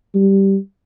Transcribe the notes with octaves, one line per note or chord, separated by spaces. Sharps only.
G3